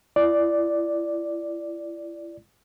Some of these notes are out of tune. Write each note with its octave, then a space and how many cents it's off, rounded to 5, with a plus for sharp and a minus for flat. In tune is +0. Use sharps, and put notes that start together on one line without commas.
E4 +35 D5 +0